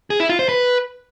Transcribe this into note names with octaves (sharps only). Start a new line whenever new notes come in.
G#4
E4
F4
C5
B4